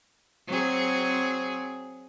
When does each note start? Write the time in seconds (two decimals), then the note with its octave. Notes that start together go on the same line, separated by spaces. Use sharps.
0.48 F#3 C4 G#4